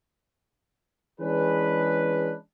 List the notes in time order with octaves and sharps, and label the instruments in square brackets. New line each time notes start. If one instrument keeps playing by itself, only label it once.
[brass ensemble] E3 G#3 C#4 D4 G#4 B4